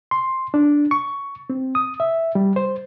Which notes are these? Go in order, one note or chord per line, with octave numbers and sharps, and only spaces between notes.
C6
D4
C#6
C4
D#6
E5
G3
C5